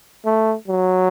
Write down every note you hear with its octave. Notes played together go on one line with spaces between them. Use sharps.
A3
F#3